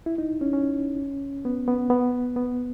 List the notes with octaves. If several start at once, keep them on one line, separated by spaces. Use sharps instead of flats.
E4
D#4
C#4
C#4
B3
B3
B3
B3